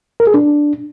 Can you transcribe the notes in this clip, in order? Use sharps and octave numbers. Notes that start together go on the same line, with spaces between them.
A#4
G#4
D4